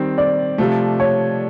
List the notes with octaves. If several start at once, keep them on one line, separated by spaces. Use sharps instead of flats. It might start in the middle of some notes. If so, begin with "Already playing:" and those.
Already playing: D#3 G3 C4
D5
C3 F3 A3
C#5